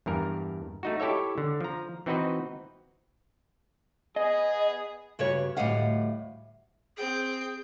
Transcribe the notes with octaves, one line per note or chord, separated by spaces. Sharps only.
E2 G2 A#4
A3 D#4 F#4
E4 G4 A4 C#5 E5
D3
F3 A#5
E3 C4 D#4 F#4 B4 D#5
B3 G#4 D#5
G2 C#3 F#4 B4 C#5
D2 A2 G3 D#5 F5 F#5
C4 G#4 G5